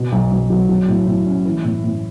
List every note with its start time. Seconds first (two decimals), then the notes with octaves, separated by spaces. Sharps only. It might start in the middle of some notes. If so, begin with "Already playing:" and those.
Already playing: B2
0.12 B1
0.31 B1
0.50 F#3
0.69 F#3
0.88 A2
1.07 A2
1.27 C#4
1.45 E3
1.64 A2
1.84 A2